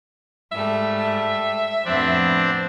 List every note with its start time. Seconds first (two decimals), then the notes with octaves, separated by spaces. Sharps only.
0.52 G#2 G3 A3 E5
1.85 F2 A2 B3 C4 D4